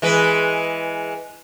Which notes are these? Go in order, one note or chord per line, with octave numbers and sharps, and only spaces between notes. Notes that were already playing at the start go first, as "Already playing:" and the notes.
E3 G#3 B4